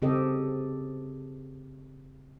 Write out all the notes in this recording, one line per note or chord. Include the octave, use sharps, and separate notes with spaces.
C#3 C4 G4 A4 D#5